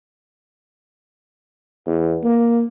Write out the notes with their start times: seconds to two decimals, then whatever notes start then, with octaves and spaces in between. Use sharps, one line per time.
1.87 E2
2.24 A#3